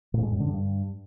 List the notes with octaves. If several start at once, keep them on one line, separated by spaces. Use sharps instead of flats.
A2
G#3
F#2
D3
G2